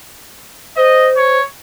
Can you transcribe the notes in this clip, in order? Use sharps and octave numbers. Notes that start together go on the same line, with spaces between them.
C5 D#5
C#5